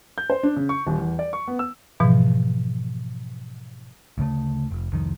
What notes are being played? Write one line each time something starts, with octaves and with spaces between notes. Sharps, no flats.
G6
C5
D4
C#3
C#6
D#1
E2
D5
C#6
B3
E6
G#2 B2 E3 F3
D2 C#3 A3
F1
C2 F2 D#3